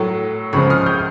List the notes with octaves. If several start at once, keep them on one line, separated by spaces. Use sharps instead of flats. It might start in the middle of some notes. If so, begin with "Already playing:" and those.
Already playing: A2 F#3 A3
C#2 C#3 F3 G#3 B5 C#6
D#6 F6
F6 G6